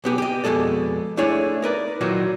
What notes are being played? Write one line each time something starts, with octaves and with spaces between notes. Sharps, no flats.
B1 B3 G4 G#4
G4 D#5
F2 B2 F3 G#3 A4 D5
A3 D4 E4 G#4 C#5 D5
D#4 A#4 B4 D5
A#2 D#3 F#3 D#4 E4 F#4